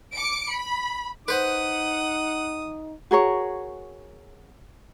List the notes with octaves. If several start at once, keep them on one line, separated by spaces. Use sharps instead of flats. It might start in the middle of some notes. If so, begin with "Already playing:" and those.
D6 C#7 D7
B5
D#4 B4 C5 F#5 D#6
F#4 G#4 A#4 C#5